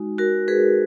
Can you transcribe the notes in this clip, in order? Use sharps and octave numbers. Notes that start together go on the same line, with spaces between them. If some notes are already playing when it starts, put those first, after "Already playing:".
Already playing: G#3 D#4 F#4
F#4 A#4
G#4 B4